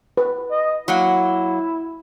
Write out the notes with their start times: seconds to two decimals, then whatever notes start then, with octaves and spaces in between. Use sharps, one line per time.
0.17 B4
0.51 D#5
0.88 F#3 A#3 E4 F#5